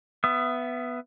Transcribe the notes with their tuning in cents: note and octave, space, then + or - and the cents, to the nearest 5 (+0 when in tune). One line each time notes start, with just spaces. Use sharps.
B3 +5 E5 +30 D#6 +0